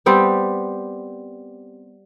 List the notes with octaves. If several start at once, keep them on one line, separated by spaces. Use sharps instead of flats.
G3 B3 C4 G4